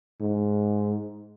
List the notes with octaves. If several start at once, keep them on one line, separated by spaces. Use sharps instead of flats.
G#2